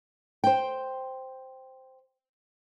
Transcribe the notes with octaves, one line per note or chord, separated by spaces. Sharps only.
C5 G5